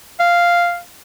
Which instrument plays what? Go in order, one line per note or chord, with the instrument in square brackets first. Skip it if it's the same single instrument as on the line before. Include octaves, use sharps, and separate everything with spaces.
[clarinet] F5